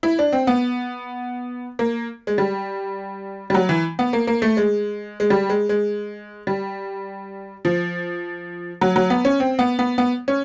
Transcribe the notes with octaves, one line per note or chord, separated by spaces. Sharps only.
E4
D4
C4
B3
A#3
G#3
G3
G3
F#3
E3
B3
A#3
A#3
A3
G#3
G#3
G3
G#3
G#3
G3
F3
F#3
F#3
B3
C#4
C4
B3
B3
B3
C#4